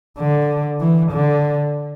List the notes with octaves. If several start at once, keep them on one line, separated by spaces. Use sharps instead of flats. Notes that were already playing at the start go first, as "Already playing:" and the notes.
D3
E3
D3